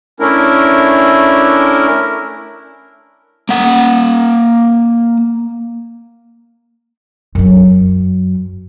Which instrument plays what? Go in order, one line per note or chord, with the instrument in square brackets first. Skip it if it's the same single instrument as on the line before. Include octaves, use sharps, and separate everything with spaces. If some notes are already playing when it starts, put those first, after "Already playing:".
[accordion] A3 C#4 D4 E4 A#4
[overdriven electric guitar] A#3 F#5
[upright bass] F#2 F#3